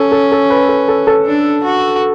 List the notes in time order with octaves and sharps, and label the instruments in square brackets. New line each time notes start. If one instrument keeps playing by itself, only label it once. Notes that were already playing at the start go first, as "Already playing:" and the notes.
Already playing: [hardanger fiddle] C#4 [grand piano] A4
[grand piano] A4
A4
B4
A4
A4
A4
[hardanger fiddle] D4
F#4